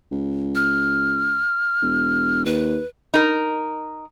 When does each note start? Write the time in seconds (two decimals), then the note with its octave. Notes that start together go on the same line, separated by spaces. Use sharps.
0.11 C#2
0.55 F6
1.82 E1
2.45 D#2 B4
3.14 D#4 A#4